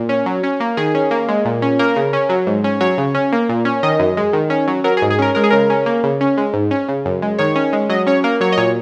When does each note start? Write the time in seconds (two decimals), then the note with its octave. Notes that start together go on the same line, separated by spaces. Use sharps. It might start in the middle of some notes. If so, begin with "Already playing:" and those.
Already playing: A#2
0.09 C#4
0.26 F#3
0.43 C#4
0.60 A#3
0.77 D#3 G#4
0.95 C#4
1.11 A#3
1.28 G#3
1.45 A#2
1.62 C#4
1.79 A#3 A#4
1.96 C#3
2.13 C#4
2.29 F#3
2.47 G#2
2.64 C#4
2.81 F#3 C#5
2.98 C#3
3.15 C#4
3.32 A#3
3.49 A#2
3.65 C#4
3.83 D#3 D#5
3.99 F#2
4.17 G#3
4.33 D#3
4.50 C#4
4.68 F#3
4.84 F#3 A#4
4.97 G#4
5.02 G#2
5.10 G#4
5.19 C#4 A#4
5.35 G#3 A#4
5.44 G#4
5.50 C#3 A#4
5.70 C#4
5.86 A#3
6.03 C#3
6.21 C#4
6.38 G#3
6.54 G#2
6.71 C#4
6.89 C#3
7.05 F#2
7.22 G#3
7.39 D#3 C#5
7.55 C#4
7.73 G#3
7.89 F#3 D#5
8.07 C#4 C#5
8.24 A#3 A#4
8.40 F#3 C#5
8.52 D#5
8.57 A#2 C#5